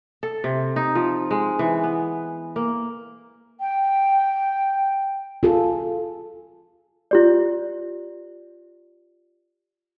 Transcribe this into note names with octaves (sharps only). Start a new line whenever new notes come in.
A4
C3
D#4
F3
G#3
E3
B3
A#3
G5
F4 G#4 A4
F4 G4 D5